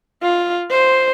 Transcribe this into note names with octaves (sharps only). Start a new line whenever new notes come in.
F4
C5